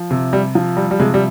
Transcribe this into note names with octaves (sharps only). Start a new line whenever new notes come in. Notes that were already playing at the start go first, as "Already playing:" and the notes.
Already playing: F3
C3
G3
F3
G3
G3
C3 G#3
G3